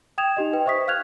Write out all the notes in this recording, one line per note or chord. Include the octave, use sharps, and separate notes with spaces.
G5 D#6 G#6 E7 F7
D#4 G4 D#5
B4 G5
C5 E5 C#6 D#6 B6
F5 F6 F#6 G#6 F7